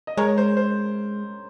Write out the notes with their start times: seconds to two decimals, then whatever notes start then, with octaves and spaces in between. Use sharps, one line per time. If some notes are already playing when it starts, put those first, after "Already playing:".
0.07 D#5
0.17 G#3 A#4 C#5
0.38 C5
0.57 C5